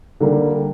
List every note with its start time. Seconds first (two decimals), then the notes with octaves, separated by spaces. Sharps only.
0.20 D3 G3 A#3